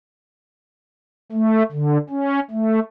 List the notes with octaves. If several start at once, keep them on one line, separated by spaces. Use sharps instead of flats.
A3
D3
C#4
A3